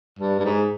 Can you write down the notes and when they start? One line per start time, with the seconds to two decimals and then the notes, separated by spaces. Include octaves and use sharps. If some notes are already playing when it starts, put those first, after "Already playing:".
0.19 G2
0.39 G2
0.45 G#2